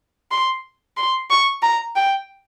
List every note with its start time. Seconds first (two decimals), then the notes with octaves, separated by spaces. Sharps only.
0.31 C6
0.97 C6
1.30 C#6
1.62 A#5
1.96 G5